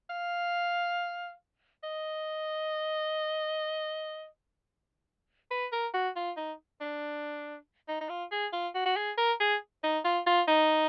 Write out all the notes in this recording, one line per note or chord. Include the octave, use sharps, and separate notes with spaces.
F5
D#5
B4
A#4
F#4
F4
D#4
D4
D#4
D#4
F4
G#4
F4
F#4
F#4
G#4
A#4
G#4
D#4
F4
F4
D#4